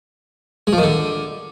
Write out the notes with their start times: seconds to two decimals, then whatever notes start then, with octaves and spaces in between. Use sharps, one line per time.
0.67 G#3
0.73 F3
0.78 D#3
0.83 D3